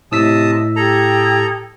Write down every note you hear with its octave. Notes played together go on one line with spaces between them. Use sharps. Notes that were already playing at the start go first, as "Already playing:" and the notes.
A2 C3 D#5 A5 D#6 E6 B6
G4 A4 A#5 D#6 G#6